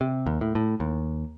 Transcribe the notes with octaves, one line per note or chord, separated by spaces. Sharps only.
C3
D#2
A2
A2
D#2